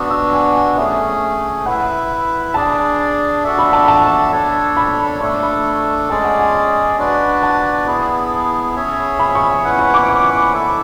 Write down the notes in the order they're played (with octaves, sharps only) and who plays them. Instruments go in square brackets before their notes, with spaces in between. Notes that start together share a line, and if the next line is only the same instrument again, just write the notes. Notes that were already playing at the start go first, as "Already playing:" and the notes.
Already playing: [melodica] B3 D4 F#4 [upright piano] E6
[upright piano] E6
G#5
G#5
[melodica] A3 C#4 G#4 [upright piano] E5
[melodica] E4 B4 E5 [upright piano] F#5
[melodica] D4 G#4 D5 [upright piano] A5
[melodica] D4 F#4 A4 E5
[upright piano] B5
A5
A5
[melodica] D4 A4 C#5
[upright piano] B5
[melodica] A3 D4 A4 [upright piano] C#6
[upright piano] B5
[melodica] G#3 C#4 G#4 D5 [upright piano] A5
[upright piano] F#5
G#5
G#5
[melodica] D4 F#4 B4 D5
[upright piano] A5
[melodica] B3 E4 G#4
C#4 G#4 C#5 E5
[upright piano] B5
C#6
[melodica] C#4 E4 B4 F#5
[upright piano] C#6
D6
D6
[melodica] E4 A4 E5